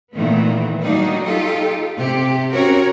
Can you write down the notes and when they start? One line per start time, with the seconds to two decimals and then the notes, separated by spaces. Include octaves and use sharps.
0.13 A#2 D#3 E3 A3 B3
0.82 F#3 G3 A#3 D4 D#4
1.24 D#4 F4 G4 A4
1.97 C3 G4
2.52 C4 C#4 F#4 A#4 C#5